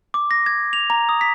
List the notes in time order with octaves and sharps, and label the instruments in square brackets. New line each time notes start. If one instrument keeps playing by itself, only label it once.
[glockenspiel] D6
A#6
G#6
F7
A#5
D#6
B6